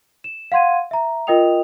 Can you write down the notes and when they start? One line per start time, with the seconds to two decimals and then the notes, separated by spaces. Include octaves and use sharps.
0.24 E7
0.52 F5 F#5 C6 G#6 D#7
0.91 E5 A#5
1.27 F4 A#4 D#5 G5 D#6 F7